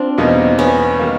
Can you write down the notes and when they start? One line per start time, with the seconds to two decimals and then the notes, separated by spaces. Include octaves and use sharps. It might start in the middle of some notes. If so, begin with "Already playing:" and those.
Already playing: C4 D4 F4
0.18 E2 B2 G3 A#3 D#4
0.59 B3 C#4
0.99 D#3 G3 A#3